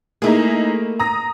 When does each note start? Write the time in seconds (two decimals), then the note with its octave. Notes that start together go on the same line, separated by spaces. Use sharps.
0.22 A3 A#3 D#4 E4 G#4
0.99 A#5 D#6 A#6